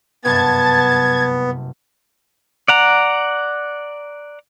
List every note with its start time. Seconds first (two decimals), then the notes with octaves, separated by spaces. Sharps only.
0.25 F#1 G2 C3 B3 A5 G#6 A6
2.68 D5 F#5 A#5